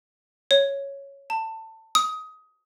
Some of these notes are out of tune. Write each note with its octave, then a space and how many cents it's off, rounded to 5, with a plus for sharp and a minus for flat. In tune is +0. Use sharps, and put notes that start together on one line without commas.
C#5 +0
A5 +20
D#6 +20